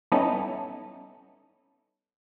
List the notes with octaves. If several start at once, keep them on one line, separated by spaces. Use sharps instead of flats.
G3 B3 C#4 D#4 E4 A4